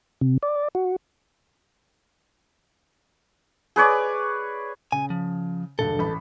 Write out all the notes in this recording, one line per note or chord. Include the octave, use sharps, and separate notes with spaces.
C3
D5
F#4
G#4 B4 C#5 D5
C#3 G#5
F3
E1 G2 D3 A4
A1 B5